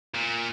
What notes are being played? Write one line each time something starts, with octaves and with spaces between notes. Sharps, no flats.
A#2